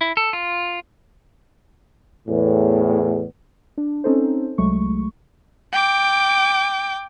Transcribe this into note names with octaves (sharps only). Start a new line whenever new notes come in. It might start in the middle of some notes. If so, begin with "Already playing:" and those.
E4
A4
F4
E2 A2
D4
C4 C#4 D#4 A4 C5
C2 F#3 G#3 A3 C#6
G5 D6